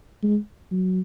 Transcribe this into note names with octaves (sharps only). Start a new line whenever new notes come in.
G#3
F#3